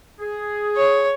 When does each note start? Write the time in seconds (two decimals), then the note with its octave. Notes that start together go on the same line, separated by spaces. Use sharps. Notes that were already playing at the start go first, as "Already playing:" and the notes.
0.20 G#4
0.76 C#5